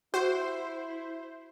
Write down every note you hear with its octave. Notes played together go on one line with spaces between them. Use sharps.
E4 F#4 C5